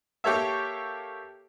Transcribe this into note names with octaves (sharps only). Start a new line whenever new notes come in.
A#3 G4 A4 C#5 E5